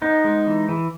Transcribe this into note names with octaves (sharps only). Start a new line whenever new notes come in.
B3 D#4
G#3
E3
E3